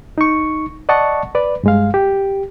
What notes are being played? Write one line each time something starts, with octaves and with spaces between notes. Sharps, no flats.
D#4 C#6
D5 D#5 F#5 A5 C#6
B4 D5
G2 G#3 F5
G4